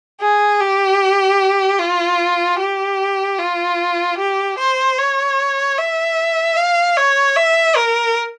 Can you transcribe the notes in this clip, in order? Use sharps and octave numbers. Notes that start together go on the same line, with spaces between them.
G#4
G4
F4
G4
F4
G4
C5
C#5
E5
F5
C#5
E5
A#4